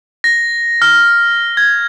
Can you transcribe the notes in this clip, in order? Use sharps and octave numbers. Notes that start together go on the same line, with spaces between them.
A#6
F6
G#6